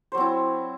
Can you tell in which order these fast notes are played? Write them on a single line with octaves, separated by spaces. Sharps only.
C5 F#3 C4 E4